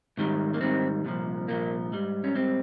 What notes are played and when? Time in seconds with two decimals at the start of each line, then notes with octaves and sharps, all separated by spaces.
0.17 G#2 D#3 G3
0.54 A#3
0.61 G#2 D#3 G3 C4
1.05 C2 A#2 F3
1.48 C2 A#2 F3 A#3
1.92 G#2 G3
2.24 C#4
2.35 G#2 G3 C4